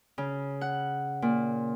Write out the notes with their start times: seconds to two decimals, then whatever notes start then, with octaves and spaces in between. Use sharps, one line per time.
0.18 C#3
0.61 F#5
1.22 A#2